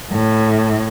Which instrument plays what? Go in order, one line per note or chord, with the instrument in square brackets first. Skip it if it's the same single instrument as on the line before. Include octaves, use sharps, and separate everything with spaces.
[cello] A2